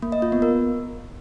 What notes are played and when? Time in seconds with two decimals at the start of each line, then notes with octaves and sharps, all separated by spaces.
0.02 A#3
0.12 D#5
0.22 F4
0.32 B3
0.42 A#4